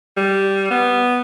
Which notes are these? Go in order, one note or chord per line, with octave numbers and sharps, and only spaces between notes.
G3
B3